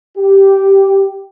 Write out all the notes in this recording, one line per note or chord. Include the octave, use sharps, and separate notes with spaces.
G4